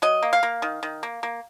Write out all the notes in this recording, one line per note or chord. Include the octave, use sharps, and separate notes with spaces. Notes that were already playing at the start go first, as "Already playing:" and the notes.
F#3 D#5
A#3
F5
A#3
D#3
D#3
A#3
A#3